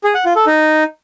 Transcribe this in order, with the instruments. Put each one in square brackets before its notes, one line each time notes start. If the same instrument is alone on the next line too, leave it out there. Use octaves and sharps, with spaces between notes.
[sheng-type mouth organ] G#4
F#5
F4
A4
D#4